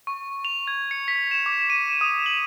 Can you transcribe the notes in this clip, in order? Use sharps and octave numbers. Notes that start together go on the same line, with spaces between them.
C#6
F7
G#6
C#7
B6
E7
D6
D#7
D#6
F#7